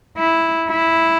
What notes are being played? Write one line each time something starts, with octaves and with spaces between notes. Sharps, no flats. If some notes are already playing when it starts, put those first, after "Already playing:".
E4
E4